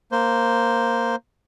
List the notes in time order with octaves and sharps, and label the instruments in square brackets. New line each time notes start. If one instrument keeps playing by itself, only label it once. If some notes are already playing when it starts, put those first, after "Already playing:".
[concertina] A#3 C5